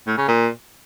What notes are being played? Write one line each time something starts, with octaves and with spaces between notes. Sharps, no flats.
A2
C#3
A#2